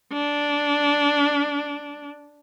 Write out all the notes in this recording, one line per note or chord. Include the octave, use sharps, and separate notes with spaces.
D4